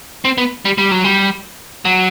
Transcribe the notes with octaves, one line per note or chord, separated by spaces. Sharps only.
C4
B3
G3
G3
F#3
G3
F#3